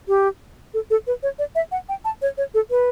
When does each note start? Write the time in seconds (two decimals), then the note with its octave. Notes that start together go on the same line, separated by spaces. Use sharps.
0.08 G4
0.74 A4
0.90 A4
1.07 B4
1.23 C#5
1.39 D5
1.55 E5
1.72 F#5
1.89 G5
2.05 A5
2.22 C#5
2.38 C#5
2.54 A4
2.71 B4